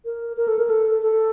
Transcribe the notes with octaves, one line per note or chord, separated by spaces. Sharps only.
A#4
A#4
A4
A#4
A4
A4